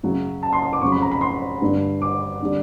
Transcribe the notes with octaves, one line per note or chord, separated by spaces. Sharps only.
F#2 C#3 F#3
A5
C6
C6
D6
F2 C#3 F#3 C#6
B5
A#5
B5
C6
G2 D3 G3
D6
D3 G3